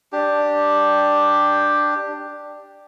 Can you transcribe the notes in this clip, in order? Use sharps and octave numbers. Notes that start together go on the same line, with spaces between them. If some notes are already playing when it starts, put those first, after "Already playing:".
D4 G4